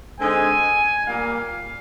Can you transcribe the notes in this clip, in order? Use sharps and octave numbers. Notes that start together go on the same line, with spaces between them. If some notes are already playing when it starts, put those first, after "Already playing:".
D3 G#3 C4 D#4 G#5
A#2 G3 A#3 F5